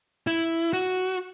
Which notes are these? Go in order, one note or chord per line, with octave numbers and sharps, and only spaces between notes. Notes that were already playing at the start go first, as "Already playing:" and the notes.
E4
F#4